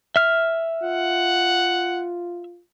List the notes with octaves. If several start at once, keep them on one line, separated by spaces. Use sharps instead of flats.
E5 F6
F4 F#5